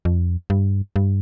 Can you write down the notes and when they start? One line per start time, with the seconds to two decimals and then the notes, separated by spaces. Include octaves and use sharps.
0.05 F2
0.50 G2
0.96 G2